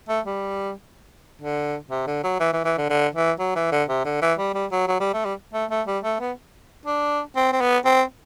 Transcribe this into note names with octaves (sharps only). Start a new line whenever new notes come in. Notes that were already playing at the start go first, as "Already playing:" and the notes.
A3
G3
D3
C3
D3
F#3
E3
E3
E3
D3
D3
E3
F#3
E3
D3
C3
D3
E3
G3
G3
F#3
F#3
G3
A3
G3
A3
A3
G3
A3
B3
D4
C4
C4
B3
C4